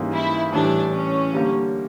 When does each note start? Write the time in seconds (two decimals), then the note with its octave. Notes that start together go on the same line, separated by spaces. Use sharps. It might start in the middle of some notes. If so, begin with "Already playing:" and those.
Already playing: G#2 E3 G3 A#3 C#4
0.13 E4
0.52 A2 E3 G3 D4
0.93 C#4
1.33 D3 G3 A#3